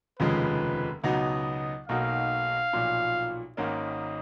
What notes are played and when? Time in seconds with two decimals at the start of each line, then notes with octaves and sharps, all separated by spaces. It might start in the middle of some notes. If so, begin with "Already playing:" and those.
0.19 F1 D#2 C#3 F3 G#3 B4
1.04 C#2 B2 F#3 B3 D#4 D#5
1.88 B1 B2 A#3 D#4 F#4 F5
2.73 B1 A#2 F3
3.57 G#1 G#2 D#3 A#3 C#4 D#5